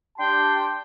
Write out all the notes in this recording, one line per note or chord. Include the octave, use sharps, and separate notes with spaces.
D4 G4 G5 A5 C6